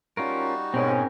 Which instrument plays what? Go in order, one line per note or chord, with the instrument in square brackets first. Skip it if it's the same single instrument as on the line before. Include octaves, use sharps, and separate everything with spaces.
[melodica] G3 D#4 F#4 [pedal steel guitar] C#4 F4 A#4
[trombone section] G#2 G#3 C#4 [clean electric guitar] B2 [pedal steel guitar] C4 A#4